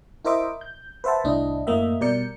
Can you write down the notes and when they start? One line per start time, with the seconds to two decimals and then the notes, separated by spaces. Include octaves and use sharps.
0.25 E4 A#4 C5 D#5 E5 D6
0.61 G6
1.04 B4 C5 E5 F#5 A5
1.24 C2 A2 D4 E4 D#5
1.67 F#2 A2 A#3 D#5 E5
2.01 B2 G3 A#4 D5 G6 C#7